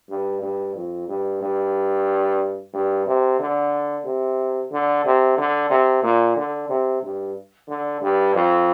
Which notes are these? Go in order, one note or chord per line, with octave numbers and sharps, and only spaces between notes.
G2
G2
F2
G2
G2
G2
C3
D3
C3
D3
C3
D3
C3
A#2
D3
C3
G2
D3
G2
F2